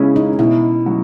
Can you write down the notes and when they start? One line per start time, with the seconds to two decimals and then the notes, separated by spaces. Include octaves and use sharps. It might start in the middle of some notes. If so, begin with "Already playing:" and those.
Already playing: C#2 C#3 G#3 C#4 E4
0.16 D#4
0.39 B2 E4
0.86 F#3